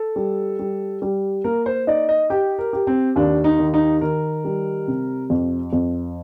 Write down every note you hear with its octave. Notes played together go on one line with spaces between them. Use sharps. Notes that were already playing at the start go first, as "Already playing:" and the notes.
Already playing: A4
G3
G3
G3
A#3 A#4
C5
D#4 D5
D#5
G4 G5
A#4
G4
C4
D#2 D4
D#4
D#3
D#4
D#3 A#4
G3
C3
F2
F2